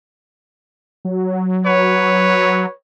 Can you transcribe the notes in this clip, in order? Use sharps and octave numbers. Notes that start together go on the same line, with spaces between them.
F#3
B4 C#5